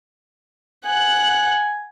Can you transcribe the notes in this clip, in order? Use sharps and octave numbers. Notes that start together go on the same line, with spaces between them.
F#5 G#5 F#6